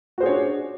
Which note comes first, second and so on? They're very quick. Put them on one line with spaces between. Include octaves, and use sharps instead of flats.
F#4 C5 G#4 C#5 D4